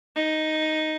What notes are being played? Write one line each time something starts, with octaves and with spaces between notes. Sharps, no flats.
D#4